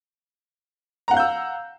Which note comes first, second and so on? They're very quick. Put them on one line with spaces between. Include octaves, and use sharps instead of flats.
A#5 F#5 F5 G6 E6